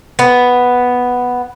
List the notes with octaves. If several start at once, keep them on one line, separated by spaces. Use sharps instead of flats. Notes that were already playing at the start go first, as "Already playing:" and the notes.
B3